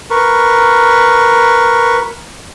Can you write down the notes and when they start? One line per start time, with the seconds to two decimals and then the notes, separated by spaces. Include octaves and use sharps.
0.10 A#4 B4 C#6